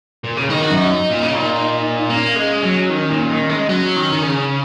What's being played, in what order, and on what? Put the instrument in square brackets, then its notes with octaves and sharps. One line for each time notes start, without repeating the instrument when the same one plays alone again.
[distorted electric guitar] A#2
C#3
[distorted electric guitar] D#3 [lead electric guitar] D#4
[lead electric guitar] F#4
[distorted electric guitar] F#2 [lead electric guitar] D#4
[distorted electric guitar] A#2
C#3
A#2
[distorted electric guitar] A#3 [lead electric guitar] C#4
[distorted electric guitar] G#3
F#3
D#3
A#2
D#3
G#3
[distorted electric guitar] F#3 [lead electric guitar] C#4
[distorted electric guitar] D#3
D#3
C#3